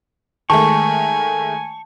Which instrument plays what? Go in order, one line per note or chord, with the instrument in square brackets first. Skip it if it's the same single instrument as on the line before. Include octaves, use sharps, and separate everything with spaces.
[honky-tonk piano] D#3 G#3 A3 [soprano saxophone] G#5 [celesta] A5 [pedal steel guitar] C#6